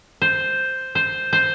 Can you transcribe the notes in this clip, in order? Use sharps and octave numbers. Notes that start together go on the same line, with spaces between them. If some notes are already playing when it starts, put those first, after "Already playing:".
C5
C5
C5